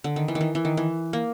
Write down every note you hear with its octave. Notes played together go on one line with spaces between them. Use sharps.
D3
D#3
E3
D#3
E3
E3
D#3
E3
A#3